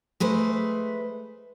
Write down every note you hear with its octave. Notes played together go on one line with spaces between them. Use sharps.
G#3 A3 B4 C5